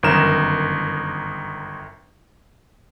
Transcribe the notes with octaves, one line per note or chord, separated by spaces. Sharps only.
G1 F#2 D#3 A#4 E7